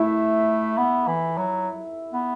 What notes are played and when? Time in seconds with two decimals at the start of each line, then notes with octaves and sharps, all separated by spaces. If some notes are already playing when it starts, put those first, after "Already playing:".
Already playing: A3 E4 E5
0.78 B3
1.07 E3
1.38 F#3
2.13 B3